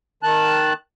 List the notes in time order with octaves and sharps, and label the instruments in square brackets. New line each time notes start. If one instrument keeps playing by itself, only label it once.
[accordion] D#3 A5 F#6